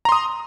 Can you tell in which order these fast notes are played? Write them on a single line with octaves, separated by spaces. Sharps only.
A#5 C6 D#6